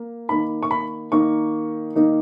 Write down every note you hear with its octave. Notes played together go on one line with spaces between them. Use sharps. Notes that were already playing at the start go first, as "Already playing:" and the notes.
Already playing: A#3
D#3 A#3 D#4 B5
C#6
B5
D#3 A#3 D#4 C#6
D#3 A#3 D#4